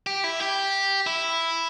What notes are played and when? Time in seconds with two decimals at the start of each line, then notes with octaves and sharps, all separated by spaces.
0.07 G4
0.24 E4
0.40 G4
1.07 E4